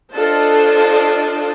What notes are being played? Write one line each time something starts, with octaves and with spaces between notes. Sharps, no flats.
D4 F4 A4 C5 D5 D#5